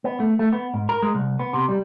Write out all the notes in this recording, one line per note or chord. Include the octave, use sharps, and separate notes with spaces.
B3
A3
A3
B3
G#2
A#4
G#3
C2
B3
C3
G3